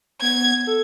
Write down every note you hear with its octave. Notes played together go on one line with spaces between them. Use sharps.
B3 G#6
A4